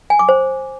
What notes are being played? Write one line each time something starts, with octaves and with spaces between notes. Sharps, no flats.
G#5
D6
C5